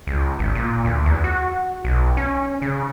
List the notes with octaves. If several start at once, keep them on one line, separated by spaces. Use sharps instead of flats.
C#2
G#1
A#2
D2
E2
F#4
B1
C#4
C#3